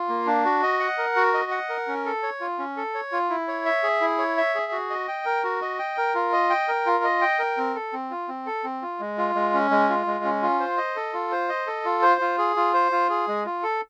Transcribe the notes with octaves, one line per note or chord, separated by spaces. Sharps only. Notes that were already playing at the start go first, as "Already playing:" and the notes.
Already playing: F4
A#3
D4
F#4
D#5
F#5
A#4
F#4
D#5
F#5
A#4
C#4
A4
C#5
F4
C#4
A4
C#5
F4
E4
C#5
E5
G#4
E4
C#5
E5
G#4
F#4
D#5
G5
A#4
F#4
D#5
G5
A#4
F4
D#5
G5
A#4
F4
D#5
G5
A#4
C4
A4
C4
F4
C4
A4
C4
F4
G#3
F4
G#3
C#4
G#3
F4
G#3
C#4
F4
C5
D#5
A4
F4
C5
D#5
A4
F4
C5
F4
G#4
F4
C5
F4
G#4
G#3
F4
A4